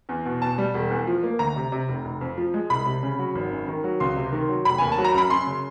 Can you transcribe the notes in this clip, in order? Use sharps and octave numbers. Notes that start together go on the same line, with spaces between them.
E2
B2
B2 A5
G3
E1
E2
F3
A#3
D2 A#5
C3
C3
F1
F1
F2
F3
G#3
C2 B5
C3
C#3
F#3
G#1
F#2
D#3
F#3
C#2 C6
C3
D#3
F#3
F1 B5
D#2 G#5
A5
F#3
A#5
F#2 B5
F#2 C6
C#3